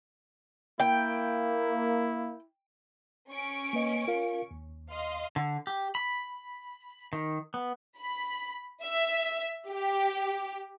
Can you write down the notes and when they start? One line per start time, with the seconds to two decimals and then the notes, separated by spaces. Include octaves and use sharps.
0.80 A#3 E4 G5
3.29 C#4 C#6 D7
3.73 A#3 B4 D#5
4.08 F4 A#4 F5
4.51 D#2
4.91 D#5 F5 C6
5.36 D3
5.67 G4
5.95 B5
7.13 D#3
7.54 B3
7.98 B5
8.84 E5
9.69 G4